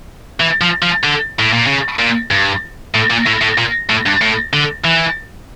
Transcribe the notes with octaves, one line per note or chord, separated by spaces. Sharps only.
E3
F3
F3
D3
A2
A#2
C#3
A#2
G2
A2
A#2
A2
A2
A#2
A2
G2
A2
D3
E3